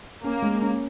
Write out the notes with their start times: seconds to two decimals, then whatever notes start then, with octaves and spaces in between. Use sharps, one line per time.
0.24 A#3 C#4
0.42 G#3
0.62 C#4